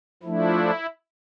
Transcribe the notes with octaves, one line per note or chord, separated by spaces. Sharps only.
F3 A3 D4 E4